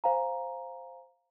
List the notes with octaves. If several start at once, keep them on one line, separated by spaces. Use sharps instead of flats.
C5 F5 G#5 A#5